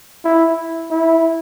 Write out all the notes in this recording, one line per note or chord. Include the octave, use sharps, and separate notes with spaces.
E4
E4